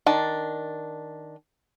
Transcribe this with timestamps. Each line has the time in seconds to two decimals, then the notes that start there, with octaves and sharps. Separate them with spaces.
0.06 D#3 D4 A5